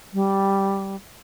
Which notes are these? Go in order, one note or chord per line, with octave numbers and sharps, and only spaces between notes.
G3